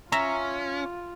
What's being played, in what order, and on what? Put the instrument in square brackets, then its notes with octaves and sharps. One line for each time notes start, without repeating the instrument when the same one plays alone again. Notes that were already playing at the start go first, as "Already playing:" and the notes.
[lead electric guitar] C#4 [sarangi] F4 [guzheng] E5 [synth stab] A#5